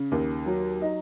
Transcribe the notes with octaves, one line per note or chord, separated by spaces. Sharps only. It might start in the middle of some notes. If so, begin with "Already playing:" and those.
Already playing: C#3
D#2
F#3
D#4